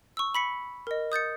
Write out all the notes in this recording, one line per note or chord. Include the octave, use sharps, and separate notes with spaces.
C#6 E6
B5 B6 C#7
A#4 D#5
D#6 G6 A6 C#7